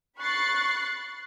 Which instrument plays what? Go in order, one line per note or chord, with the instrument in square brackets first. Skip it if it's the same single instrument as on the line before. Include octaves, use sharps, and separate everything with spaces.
[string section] B5 C#6 F#6 A6 C7